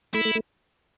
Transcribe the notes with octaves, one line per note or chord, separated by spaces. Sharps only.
A3 E4
A3
A3